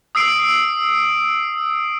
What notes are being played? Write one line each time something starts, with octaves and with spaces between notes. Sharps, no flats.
D#6 E6 C7 D7